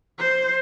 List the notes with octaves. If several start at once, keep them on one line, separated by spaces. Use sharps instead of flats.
C5